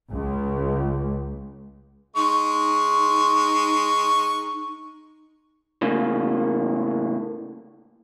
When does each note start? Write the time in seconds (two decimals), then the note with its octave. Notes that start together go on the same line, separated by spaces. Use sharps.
0.12 C#2
2.16 G#3 D#4 C#6
5.82 A2 C#3 A#3